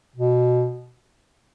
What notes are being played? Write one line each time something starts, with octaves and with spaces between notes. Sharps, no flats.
B2